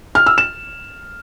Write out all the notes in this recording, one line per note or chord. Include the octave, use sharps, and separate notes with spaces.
F6
E6
E7